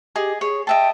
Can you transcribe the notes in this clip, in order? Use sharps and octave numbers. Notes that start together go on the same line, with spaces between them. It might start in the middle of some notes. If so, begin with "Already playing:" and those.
G4 G#4 D#5
G#4 C#5
D#5 E5 G5 A5